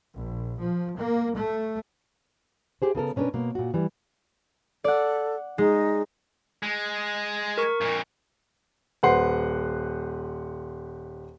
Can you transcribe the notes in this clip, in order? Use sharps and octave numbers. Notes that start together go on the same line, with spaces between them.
A#1
F3
A#3
A3
G4 G#4 C5
C#3 B3 A4 A#4
B2 C#4 D4 A#4 B4
B2 A#3
A#2 F#4
E3 G3
A4 D5 F#5
G#3 D#4
G#3
A#4 C#6
F2 A#2
D#1 B4 C5 F#5 C6 C7